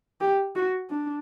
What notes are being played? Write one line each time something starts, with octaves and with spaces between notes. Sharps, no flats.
G4
F#4
D4